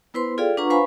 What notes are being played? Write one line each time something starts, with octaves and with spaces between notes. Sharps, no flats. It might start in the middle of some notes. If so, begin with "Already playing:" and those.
B3 E4 B4 C5 C6
F4 G#4 A4 D5 F5 G5
D4 F4 B4 F#5 A#5 C#6
B4 C5 F5 G#5 B5 C#6